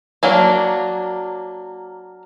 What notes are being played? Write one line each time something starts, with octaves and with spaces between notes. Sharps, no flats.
F#3 A#3 D4